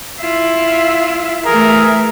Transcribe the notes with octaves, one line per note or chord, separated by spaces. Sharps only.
E4 F4
E3 A3 G#4 A#4